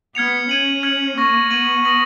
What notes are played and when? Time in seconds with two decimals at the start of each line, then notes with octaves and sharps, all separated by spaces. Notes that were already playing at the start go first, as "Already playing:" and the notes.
0.15 B3 F6 G#6 C#7 F7
0.49 C#4 G#6 D#7 F#7
0.83 F6 G#6 C#7 F#7
1.16 A#3 C#6 F6 A#6
1.50 B3 G#6 D#7 F#7
1.85 D#6 A#6 D#7 F#7